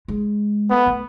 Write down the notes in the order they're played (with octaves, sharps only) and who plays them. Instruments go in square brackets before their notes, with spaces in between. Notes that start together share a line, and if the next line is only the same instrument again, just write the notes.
[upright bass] G#3
[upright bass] A3 [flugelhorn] B3
[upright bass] A3